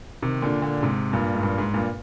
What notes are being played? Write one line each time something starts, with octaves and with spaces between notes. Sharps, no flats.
C3 D#3
A#2 D3
A#2 D3
G#2 C3
G2 A#2
G#2
G2 A#2
G#2
G2 A#2